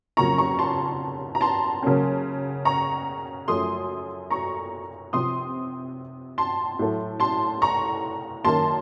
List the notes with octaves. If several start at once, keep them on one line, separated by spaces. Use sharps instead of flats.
F2 C#3 F#3 A#3 A#5 C#6
A#5 C#6
A5 C6
A#5
A5 C6
C#3 F#3 A#3 C#4
A#5 C#6
F#2 F3 A3 C6 D#6
A#5 C#6
C3 F3 C4 C6 D#6
A5 C6
A2 F#3 A3
A5 C6
A#5 C#6
F#2 D#3 A#3 A5 C6